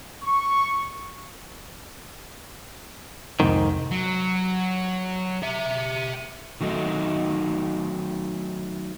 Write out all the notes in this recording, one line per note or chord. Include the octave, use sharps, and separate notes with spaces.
C#6
C2 F2 G#2 C3 D#3
F#3
G4 E5
D#3 F#3 A3 D#4